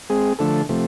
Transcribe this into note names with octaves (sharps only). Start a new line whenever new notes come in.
G#3 C4 G#4
D3 F3 A3 D4 A4
C3 F3 A3